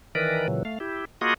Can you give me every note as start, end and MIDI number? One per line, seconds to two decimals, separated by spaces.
0.15 0.47 51
0.15 0.47 52
0.15 0.47 70
0.15 0.47 71
0.15 0.47 74
0.48 0.63 46
0.48 0.63 49
0.48 0.63 52
0.48 0.63 54
0.65 0.79 57
0.65 0.79 77
0.80 1.05 64
0.80 1.05 67
1.21 1.34 58
1.21 1.34 65
1.21 1.34 66
1.21 1.34 68
1.21 1.34 75
1.21 1.34 78